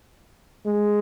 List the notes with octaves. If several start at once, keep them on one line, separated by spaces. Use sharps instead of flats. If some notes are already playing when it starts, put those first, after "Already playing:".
G#3